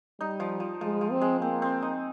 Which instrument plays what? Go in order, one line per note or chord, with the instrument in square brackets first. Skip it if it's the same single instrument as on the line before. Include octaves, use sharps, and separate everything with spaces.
[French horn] G3 [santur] D#4
[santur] F3
F3
[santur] F3 [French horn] G#3
[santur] F3
[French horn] C4
[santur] G#3
[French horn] A#3 [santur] C4
[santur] C4
D#4